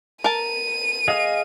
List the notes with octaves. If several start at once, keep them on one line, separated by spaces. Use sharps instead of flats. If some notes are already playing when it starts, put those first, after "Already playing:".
A#4 A5 D#7
G#4 D#5 F5